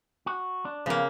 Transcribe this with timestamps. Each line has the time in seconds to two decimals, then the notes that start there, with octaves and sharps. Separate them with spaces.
0.26 F#4
0.65 D4
0.86 C#3 F3 A#3 B3